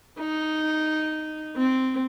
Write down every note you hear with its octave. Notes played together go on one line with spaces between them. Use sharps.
D#4
C4